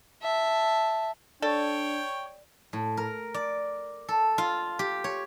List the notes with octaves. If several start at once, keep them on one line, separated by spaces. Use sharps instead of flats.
E5 A5
D4 A4 C#5 D5 G5
A2
A#4
D5
A4
F4
G4
C#5